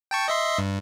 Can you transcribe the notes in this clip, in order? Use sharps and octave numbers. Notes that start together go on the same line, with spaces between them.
G5 A5 C#6
D#5 E5 C6
G2